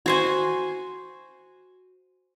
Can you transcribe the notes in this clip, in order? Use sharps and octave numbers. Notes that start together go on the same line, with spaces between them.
F#4 C5 G#5